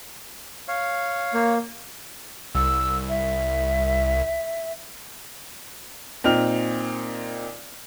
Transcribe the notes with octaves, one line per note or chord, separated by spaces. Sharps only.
C#5 F5
A#3
C2 E6
E5
A#2 C4 D#4 G5 F6 F7